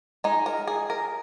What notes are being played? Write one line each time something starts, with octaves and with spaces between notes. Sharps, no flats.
G#3 D#4
A#4
G#4
A#4